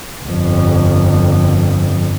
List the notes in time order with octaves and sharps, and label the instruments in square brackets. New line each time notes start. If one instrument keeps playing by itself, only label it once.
[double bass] G1 F2